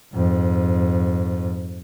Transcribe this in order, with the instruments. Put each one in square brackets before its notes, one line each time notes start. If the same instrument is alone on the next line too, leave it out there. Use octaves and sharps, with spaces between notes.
[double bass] F2 G#2